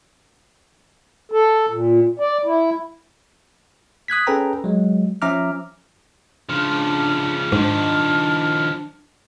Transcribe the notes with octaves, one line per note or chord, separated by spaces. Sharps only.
A4
A#2
D5
E4
D#6 F#6 G#6 B6
C#4 G#4 A4 B4 G5 A#5
F#3 G#3
F3 C#4 E5 A#5 D6 F6
C#3 F3 D4 F6
G#2 D#3 F3 D4